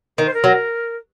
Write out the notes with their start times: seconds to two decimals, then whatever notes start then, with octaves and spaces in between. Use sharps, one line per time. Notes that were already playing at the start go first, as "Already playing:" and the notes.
0.18 D#3 A#4
0.26 C5
0.34 A#4
0.44 F#3